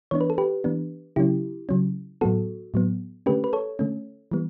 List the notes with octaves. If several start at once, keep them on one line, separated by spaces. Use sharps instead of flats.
E3 B3 D4 C#5
B4
A4
G4 B4
E3 B3 D4
C#3 F#3 C#4 E4 G4
C#3 F#3 C#4
A2 F#3 B3 F#4 A4
A2 F#3 B3
D3 A3 C#4 G4 B4
B4
A4 C#5
D3 A3 C#4
E3 G3 B3